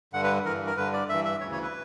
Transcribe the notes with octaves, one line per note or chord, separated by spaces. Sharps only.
G2 D3 F#5
B4
G2 E3 A#4
A#4
G2 D3 B4
D5
G2 E3 E5
E5
D2 C#3 E3 C#5
C#5
B4